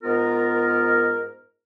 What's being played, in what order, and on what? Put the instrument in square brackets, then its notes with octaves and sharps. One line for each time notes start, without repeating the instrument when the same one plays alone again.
[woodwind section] G#2 B3 F4 A#4